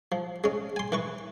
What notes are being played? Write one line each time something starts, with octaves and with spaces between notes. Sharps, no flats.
F3
G#3 C#4
G#5 C6
E3 B4 C#6